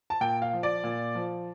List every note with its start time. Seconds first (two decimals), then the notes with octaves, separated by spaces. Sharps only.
0.10 A5
0.21 A#2 G5
0.42 F5
0.53 F3
0.63 D5
0.84 A#2
1.15 F3